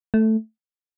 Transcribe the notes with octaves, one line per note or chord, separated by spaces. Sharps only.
A3